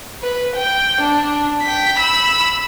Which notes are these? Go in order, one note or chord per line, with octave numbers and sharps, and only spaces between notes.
B4
G5
D4
G5 B6
B5 E6